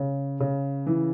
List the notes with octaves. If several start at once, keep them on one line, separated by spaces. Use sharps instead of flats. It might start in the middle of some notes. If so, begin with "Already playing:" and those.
Already playing: C#3
C#3
E3